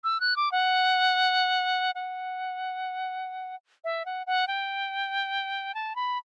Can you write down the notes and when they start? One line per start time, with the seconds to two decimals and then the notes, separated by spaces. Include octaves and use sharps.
0.04 E6
0.20 F#6
0.36 D6
0.52 F#5
1.95 F#5
3.84 E5
4.05 F#5
4.27 F#5
4.47 G5
5.75 A5
5.96 B5